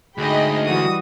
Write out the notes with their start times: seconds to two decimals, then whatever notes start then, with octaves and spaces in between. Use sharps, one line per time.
0.18 D2 G#2 G#4 D#5 G5 B5
0.65 E3 G3 F#4 D#6